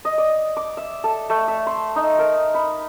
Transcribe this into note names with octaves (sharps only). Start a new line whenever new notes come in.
D#5
D5
D6
E5
A4
A3
E5
C6
D#4
A#4
B5